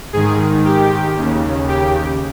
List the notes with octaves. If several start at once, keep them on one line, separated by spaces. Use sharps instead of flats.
G#2 D#3 G#4
G4
D#2 C#3
G4